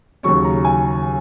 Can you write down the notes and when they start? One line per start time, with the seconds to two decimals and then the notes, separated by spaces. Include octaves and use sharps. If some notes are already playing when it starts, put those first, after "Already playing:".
0.23 D#2 C#3 F#3 C#4 C#6
0.45 A#5
0.65 G#5